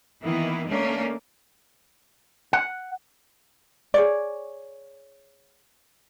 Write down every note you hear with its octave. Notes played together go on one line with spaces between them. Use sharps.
D#3 E3 A#3 B3 E4
A3 A#3 C#4 D4
F#5
G#4 C#5 D5